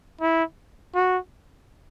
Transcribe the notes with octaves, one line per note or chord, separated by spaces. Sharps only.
E4
F#4